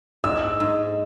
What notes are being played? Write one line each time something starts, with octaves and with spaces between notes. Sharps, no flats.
G#2 E6
G#2